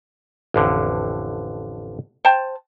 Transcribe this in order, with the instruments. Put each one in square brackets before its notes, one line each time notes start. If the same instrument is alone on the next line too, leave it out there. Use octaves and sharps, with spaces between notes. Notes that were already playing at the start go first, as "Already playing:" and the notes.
[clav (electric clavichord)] A1 F2 D3
[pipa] C5 G5 A5